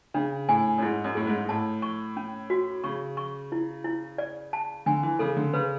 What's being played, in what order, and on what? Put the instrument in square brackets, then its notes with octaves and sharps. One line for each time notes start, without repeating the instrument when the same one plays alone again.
[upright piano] C#3 [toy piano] D4
[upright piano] A2 [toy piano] G#5
[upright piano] F#2
[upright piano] G#2 [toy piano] E4
[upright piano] F#2
[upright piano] A2 [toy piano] G#4
[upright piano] G#2
G#2
[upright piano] A2 [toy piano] A5
[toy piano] C#6
C#4
F#4
[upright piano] C#3 [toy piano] C#6
[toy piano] C#6
E4
E4
D5
A5
[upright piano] D3 [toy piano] G#5
[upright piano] E3
[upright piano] C#3 [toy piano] A4
[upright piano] D3
[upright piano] C#3 [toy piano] B4